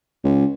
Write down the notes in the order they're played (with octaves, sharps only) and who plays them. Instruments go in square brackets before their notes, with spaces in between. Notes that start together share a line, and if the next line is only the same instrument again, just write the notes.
[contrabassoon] C#2